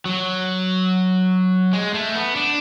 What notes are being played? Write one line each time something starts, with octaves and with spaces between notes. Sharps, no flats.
F#3
G#3
A3
B3
D4